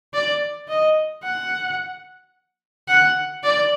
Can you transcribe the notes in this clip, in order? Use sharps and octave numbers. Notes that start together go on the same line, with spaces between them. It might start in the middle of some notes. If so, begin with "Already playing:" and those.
D5
D#5
F#5
F#5
D5